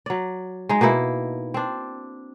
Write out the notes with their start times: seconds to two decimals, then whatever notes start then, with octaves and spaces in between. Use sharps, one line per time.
0.06 F#3 D5
0.69 G#3 D#4
0.81 B2 A#3 D#4 E4
1.54 C4 D4